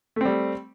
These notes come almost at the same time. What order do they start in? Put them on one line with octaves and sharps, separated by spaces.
A3 C4 G3